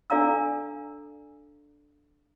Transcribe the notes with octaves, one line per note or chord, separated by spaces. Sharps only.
D4 A4 D5 F5 A#5 E6